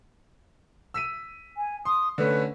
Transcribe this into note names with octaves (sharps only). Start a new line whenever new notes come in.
E6 B6 D#7
G#5
C6 D#6
D3 A3 C#4 B4